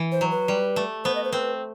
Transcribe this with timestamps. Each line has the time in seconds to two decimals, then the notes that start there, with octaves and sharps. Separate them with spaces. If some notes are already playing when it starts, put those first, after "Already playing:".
Already playing: E3
0.12 C5
0.21 F#3
0.31 B4
0.48 G3
0.76 A3
1.04 B3 C5
1.15 D#5
1.24 C5
1.33 C4 B4